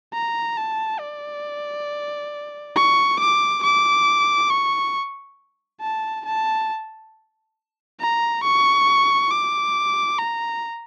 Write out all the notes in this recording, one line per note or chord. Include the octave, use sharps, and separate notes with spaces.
A#5
A5
D5
C#6
D6
D6
C#6
A5
A5
A#5
C#6
D6
A#5